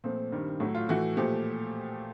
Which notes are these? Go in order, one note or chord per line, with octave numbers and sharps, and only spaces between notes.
A#2 F3 A3 C4
G2 D#3 G3
A2 F#3 A3
F4
A2 E3 A3 F#4
A#2 F3 A3 G4